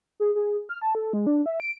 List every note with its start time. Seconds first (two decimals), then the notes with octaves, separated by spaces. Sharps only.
0.20 G#4
0.35 G#4
0.69 F6
0.82 A5
0.95 A4
1.13 G#3
1.27 D4
1.46 E5
1.60 D7